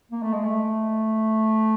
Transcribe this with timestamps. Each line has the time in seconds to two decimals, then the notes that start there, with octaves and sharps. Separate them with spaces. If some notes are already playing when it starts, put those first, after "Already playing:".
0.12 A#3
0.22 A3
0.33 G#3
0.44 A3